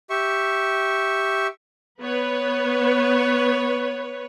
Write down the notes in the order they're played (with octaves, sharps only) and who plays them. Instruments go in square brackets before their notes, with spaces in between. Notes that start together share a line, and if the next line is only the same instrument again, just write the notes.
[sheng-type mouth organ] G4 E5 C#6
[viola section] B3 B4 C#5